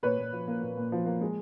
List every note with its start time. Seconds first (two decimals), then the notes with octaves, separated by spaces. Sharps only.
0.03 A#2 B4 C#5
0.18 A#2
0.32 F3
0.48 A#3
0.61 A#2
0.77 A#2
0.92 F3
1.06 A#3
1.21 G#3